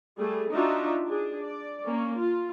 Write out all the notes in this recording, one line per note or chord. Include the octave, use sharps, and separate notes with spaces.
G3 A3 G#4
D4 D#4 F4 F#4 E5
D4 G#4
D5
A#3 C#4
F4